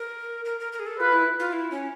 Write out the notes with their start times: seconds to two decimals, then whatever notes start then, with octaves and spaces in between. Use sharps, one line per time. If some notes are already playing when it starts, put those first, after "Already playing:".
Already playing: A#4
0.45 A#4
0.60 A#4
0.72 A#4
0.79 G#4
0.86 A4
1.00 F4 B4
1.12 E4
1.40 F4
1.52 E4
1.71 C#4